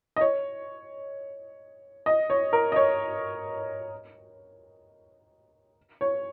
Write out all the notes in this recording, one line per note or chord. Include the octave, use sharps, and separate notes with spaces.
D#5
C#5
D#5
C#5
A#4
D#5
C#5
C#5